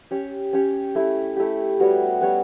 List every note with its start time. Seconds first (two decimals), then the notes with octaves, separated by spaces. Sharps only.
0.11 C#4 G4 C#5
0.53 C#4 G4 C#5
0.95 A3 E4 G4
1.36 A3 E4 G4
1.80 G3 B3 F#4 C#5
2.21 G3 B3 F#4 C#5